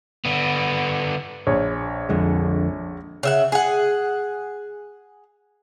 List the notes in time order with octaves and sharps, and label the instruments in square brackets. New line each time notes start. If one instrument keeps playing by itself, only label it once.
[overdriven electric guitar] D3 B3
[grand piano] A#1 C#5
[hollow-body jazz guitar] F2 D3 G#3
[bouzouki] C#3 E5 F#5
G#4 F#5